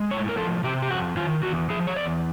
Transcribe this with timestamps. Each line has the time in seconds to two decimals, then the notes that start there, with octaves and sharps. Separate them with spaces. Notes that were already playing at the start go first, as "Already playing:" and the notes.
Already playing: G#3
0.11 A2 C#5
0.29 A#4
0.37 F3 A4
0.64 C3 G4
0.82 G4
0.90 F2 F#4
1.17 D#3 F4
1.43 E2 F#4
1.70 F3 G#4
1.87 C#5
1.96 E2 D5